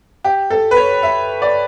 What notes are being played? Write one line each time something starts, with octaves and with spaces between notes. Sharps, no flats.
G4
A4
B4
C#5
E5
D5